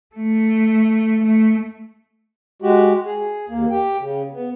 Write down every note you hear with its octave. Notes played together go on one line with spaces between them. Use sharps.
A3
A3
G#3 F#4 G4
G#4
D#2 A#3
G4 G5
C#3
B3